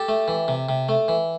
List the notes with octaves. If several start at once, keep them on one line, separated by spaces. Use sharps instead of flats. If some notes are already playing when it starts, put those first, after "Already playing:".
Already playing: G4 A4
A3
E3
C3
C3
A3
E3